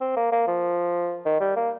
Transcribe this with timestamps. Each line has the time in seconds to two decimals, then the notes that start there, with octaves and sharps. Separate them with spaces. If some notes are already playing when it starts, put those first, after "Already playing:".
0.01 C4
0.17 A#3
0.32 A#3
0.48 F3
1.25 D#3
1.40 G3
1.56 A#3